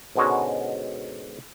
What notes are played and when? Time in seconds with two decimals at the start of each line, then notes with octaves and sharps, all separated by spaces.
0.15 G#2 B2 D3 G#3 C#4 F#4